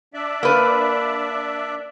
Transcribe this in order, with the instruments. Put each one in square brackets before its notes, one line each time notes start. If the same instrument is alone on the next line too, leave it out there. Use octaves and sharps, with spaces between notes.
[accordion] D4 D5 E5
[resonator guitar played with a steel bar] A#3 B4